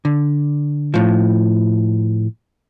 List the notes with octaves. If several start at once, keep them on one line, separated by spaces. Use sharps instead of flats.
D3
A2 F3